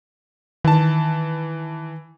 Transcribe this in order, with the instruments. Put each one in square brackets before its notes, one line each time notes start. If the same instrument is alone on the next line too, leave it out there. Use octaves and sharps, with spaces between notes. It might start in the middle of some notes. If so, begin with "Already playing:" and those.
[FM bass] D#3 [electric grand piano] E3 A5